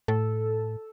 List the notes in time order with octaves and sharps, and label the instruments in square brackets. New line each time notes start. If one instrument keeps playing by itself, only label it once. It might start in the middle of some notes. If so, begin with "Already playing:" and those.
[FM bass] A2 [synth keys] A4